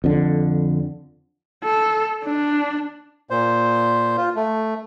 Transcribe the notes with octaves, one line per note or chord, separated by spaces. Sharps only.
F2 D3
A4
D4
A#2 C5
F4
A3